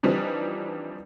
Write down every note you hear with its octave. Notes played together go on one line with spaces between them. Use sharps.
E3 F3 G3 C4 D4 D#4